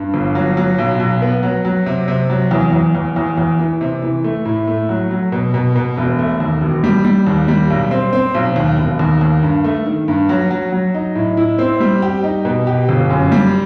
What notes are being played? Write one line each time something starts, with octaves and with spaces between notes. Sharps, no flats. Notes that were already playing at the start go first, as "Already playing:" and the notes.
Already playing: G2
G1
F#3
F#3
B1
B1
B3
F#3
F#3
C3
C3
F#3
E2
E2
E2
E2
E2
E3
C3
E3
A3
A2
A3
F#3
F#3
B2
B2
B2
E1
A3
D#2
E1
G3
G3
D#2
G3
B1
C4
C4
B1
D#2
E1
D#2
D#2
G2
A3
D#3
G2
F#3
F#3
F#3
D#4
A2
E4
C4
G3
G4
D#4
B2
G4
G1
F#2
G3